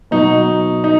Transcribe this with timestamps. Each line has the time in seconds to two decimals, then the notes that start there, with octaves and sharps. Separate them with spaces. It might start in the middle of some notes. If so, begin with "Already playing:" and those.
0.11 B2 F#3 D#4
0.84 D#4